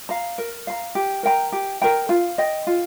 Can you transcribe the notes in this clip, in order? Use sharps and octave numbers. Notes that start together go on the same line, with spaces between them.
F5 A#5
A#4
F5 A#5
G4
A#4 G5 A#5
G4
A#4 G5 A#5
F4
D#5 G5
F4